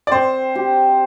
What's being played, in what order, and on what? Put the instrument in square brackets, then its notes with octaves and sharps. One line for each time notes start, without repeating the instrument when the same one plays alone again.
[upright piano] D5
[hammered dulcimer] C4 [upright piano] C5
[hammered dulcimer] G4